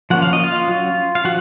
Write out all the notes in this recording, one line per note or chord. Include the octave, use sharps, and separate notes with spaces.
F3 A#3 C#4 F#5
F5
D#5
F4 F5
F#3 C#4
F5
F3 F#4 F#5